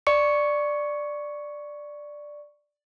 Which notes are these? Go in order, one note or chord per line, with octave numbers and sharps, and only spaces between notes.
D5 C#6 C#7